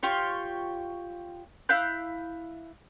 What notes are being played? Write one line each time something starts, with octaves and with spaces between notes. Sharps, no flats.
F4 G4 C#5
E4 F5 F#6 G6